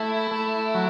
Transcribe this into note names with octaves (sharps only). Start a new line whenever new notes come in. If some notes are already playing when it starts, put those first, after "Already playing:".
Already playing: A3 E4
A3
F#3